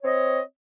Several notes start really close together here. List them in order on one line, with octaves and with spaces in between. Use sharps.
C#5 C4 D#5